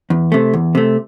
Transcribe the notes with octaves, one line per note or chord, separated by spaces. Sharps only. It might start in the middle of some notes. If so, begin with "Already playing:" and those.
E2
C3 A3
E2
C3 A3